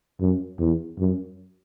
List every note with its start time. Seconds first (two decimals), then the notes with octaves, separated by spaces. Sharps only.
0.20 F#2
0.60 E2
0.99 F#2